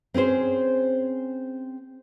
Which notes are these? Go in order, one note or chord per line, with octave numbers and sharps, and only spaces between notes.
C4 C#4 G#4 C5